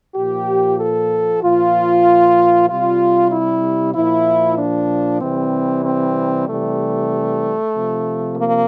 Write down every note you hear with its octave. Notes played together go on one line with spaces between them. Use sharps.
A#2 F3 G4
A4
A#2 F3 F4
C3 G3 F4
E4
A#2 F3 E4
D4
C3 E3 G3 C4
C4
C3 E3 G3 A3
C3 F3
A#3